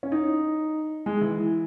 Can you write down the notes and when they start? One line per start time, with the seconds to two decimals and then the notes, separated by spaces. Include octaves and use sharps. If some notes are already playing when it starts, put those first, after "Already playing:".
0.03 C#4
0.12 D#4
1.06 G#3
1.21 E3